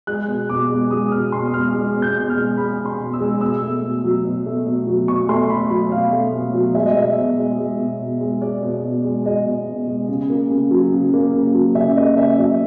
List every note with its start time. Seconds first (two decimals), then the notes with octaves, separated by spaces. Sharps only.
0.07 G#3 F#6
0.28 B2
0.49 B2 D6
0.70 G#3
0.91 G#3 D#6
1.12 B2 F6
1.32 B2 C6
1.53 G#3 F6
1.74 G#3
1.96 B2
2.02 G6
2.16 B2
2.30 F6
2.37 G#3
2.57 G#3 B5
2.79 B2
2.86 C6
2.99 B2
3.13 E6
3.20 G#3
3.41 B2 E6
3.62 A3
3.83 B2
4.04 F#3
4.25 B2
4.46 A3
4.67 B2
4.87 F#3
5.08 B2 C#6
5.29 A3 C6
5.50 B2 B5
5.70 F#3 B5
5.92 B2 F5
6.13 A3
6.33 B2
6.54 F#3
6.75 G#3 E5
6.86 D#5
6.96 B2 E5
7.17 B2
7.38 G#3
7.59 G#3
7.79 B2
8.00 B2
8.21 G#3
8.42 G#3 D5
8.63 B2
8.84 B2
9.04 G#3
9.26 G#3 D#5
9.46 B2
9.67 B2
9.87 G#3
10.08 C#3
10.30 A#3
10.50 C#3
10.71 F#3
10.92 C#3
11.14 A#3
11.34 C#3
11.54 F#3
11.75 C#3 E5
11.96 A#3 D#5
12.17 C#3 E5
12.38 F#3 E5